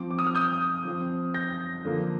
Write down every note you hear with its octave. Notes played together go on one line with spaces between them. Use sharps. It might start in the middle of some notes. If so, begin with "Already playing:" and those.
Already playing: F3 C4 D6
D6
D#6
F6
D#6 G6
F3 C4
G6 A#6
D3 F3 A#3